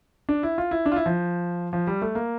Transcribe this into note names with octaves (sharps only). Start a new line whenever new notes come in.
D4
E4
F4
E4
D4
F4
E4
F3
F3
G3
A3
A#3